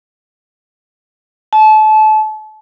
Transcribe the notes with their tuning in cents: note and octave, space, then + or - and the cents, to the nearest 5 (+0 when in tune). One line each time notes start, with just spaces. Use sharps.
A5 -30